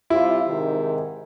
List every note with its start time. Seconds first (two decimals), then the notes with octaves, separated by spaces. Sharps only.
0.10 C3 G3 E4 F4
0.47 G#2 C3 D#3